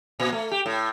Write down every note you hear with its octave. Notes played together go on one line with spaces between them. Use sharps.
A#2
A3
G4
A2